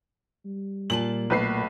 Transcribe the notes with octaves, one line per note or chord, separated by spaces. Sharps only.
G3
A#2 F4 A5 F#7
B1 A3 B4 C7